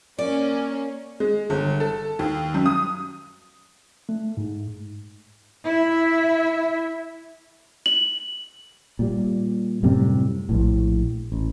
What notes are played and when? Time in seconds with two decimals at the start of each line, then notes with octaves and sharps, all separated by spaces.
0.19 A#3 C#4 D5
1.20 G#3
1.50 G1
1.80 A4
2.19 D#2
2.54 F#2
2.66 D#6
4.09 A3
4.37 G#2
5.64 E4 E5
7.86 F#7
8.99 A#2 G3
9.83 F#2 A2 C3 G3
10.49 A#1 A2
11.32 A1